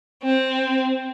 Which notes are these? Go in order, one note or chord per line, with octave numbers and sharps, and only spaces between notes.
C4